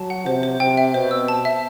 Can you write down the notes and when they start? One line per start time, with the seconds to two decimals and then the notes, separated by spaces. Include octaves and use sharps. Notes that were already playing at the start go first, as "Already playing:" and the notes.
Already playing: F#3 A5
0.10 F#5
0.26 C3 C5
0.43 C5
0.60 C3 G5
0.77 E5
0.94 B2 C5
1.11 E6
1.28 A5
1.45 E5